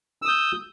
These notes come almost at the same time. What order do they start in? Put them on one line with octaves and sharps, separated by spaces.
E6 D#6 G6